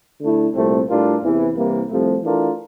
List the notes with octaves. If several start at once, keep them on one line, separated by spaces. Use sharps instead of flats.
D3 A3 E4
C2 A#2 A3 C4
A2 G3 D4 F4 A#4
E2 C3 E3
C2 C3 E3 A#3
C2 C3 F3 A3
E3 A3 D4 F4 A#4